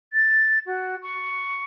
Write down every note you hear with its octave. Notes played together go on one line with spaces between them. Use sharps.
A6
F#4
C#6